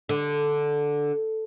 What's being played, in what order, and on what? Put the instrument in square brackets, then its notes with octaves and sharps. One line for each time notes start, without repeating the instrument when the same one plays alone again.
[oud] D3